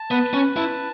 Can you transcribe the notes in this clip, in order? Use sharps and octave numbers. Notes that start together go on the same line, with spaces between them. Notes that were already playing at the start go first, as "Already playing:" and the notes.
Already playing: A5
B3 B4
C#4
E4 A5